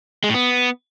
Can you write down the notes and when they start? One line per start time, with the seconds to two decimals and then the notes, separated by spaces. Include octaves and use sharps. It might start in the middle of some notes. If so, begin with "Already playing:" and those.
0.24 G#3
0.29 A2
0.34 B3